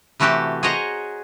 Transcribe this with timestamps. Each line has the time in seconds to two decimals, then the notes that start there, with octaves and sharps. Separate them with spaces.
0.20 C3 E3 A3 F#4 G4 A5
0.63 G#4 C5 C#5 D#5 F#5 A#5